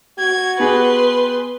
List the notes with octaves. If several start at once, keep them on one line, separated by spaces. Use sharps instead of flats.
F#4 G#6
B3 G4 G#4 B4 C6